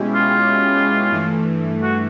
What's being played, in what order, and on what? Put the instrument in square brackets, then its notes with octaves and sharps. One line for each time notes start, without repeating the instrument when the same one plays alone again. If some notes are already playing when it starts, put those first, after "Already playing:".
Already playing: [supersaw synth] B2 G#3 C#4 E4 G4
[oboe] F4
[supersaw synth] G2 E3 A3
[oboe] F#4